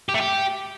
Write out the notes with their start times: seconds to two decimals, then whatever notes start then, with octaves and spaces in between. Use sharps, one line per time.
0.09 G4
0.14 A3
0.20 G4